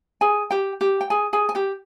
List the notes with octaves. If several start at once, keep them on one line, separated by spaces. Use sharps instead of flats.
G#4 G#5
G4 G5
G4 G5
G5
G#4 G#5
G#4 G#5
G#5
G4 G5